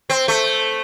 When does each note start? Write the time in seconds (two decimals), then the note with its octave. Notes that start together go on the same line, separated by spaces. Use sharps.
0.10 C4
0.28 A3